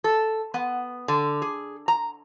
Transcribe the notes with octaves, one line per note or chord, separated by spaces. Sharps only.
A4
B3
D3
G#4
A#5